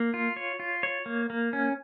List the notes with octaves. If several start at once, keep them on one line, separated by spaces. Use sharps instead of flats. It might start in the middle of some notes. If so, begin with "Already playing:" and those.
Already playing: A#3
F4
C#5
F4
C#5
A#3
A#3
C#4